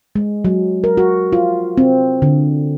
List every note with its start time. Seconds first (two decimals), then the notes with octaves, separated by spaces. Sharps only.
0.15 G#3
0.45 F#3
0.84 A#4
0.97 F#4
1.33 F4
1.77 C4
2.22 D3